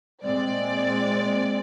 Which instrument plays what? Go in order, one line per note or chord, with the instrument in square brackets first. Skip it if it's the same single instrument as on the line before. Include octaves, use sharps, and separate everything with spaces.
[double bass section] A#2 G#3 C4 [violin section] D5